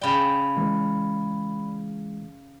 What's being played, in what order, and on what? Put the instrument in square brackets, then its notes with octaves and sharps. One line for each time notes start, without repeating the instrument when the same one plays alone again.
[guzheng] C#3 G5 [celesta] D5 B5
[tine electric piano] E3 G#3